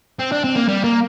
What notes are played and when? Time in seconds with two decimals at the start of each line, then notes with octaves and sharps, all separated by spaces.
0.19 C4
0.32 D4
0.44 C4
0.56 A#3
0.68 G3
0.84 A#3